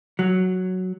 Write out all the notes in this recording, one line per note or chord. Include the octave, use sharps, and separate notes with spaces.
F#3